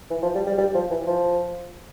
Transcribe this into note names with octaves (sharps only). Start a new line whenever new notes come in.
E3
F3
G3
G3
G3
F3
E3
F3